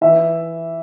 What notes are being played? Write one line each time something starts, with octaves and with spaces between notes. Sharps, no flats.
E3 E5